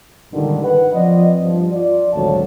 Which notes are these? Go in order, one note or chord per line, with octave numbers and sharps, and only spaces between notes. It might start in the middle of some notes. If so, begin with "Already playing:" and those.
C#2 G2 A#2 D3 D#3
B4 F#5
F3 C4 F4 D5 D#5
G2 F3
F4 D5
G#1 D2 A#2 F#3 C#5 A5